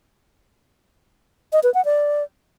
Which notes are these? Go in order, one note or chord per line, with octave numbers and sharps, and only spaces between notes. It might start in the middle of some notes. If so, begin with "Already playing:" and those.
D#5
B4
F#5
D5